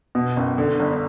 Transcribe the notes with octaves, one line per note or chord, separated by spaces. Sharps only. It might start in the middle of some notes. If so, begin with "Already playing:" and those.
B2
F#1
D3
G1